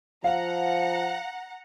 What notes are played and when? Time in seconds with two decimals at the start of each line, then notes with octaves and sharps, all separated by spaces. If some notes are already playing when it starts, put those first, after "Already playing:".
0.24 F3 F5 F#5 A#5